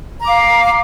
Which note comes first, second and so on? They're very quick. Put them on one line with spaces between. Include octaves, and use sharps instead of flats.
A#5 D6 F5